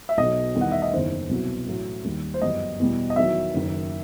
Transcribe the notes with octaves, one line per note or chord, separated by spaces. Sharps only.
E5
B1 B2 F#3 D#5
E2 D#3 G3
F#5
E5
D#5
F#1 E2 D#3 C5
C2 B2 F#3
A1 A2 F#3
D#2 D#3 G3
C5
G1 F#2 E3 G3 D#5
E2 B2 G3
D#5
E2 D#3 F#3 E5
F#1 F#2 D#3